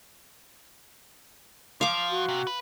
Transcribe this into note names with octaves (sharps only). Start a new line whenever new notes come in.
F3 F5 D6
F#4
C3
B4